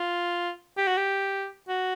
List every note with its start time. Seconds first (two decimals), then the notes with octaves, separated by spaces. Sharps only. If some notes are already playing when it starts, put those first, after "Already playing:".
Already playing: F4
0.77 G4
0.87 F#4
0.97 G4
1.69 F#4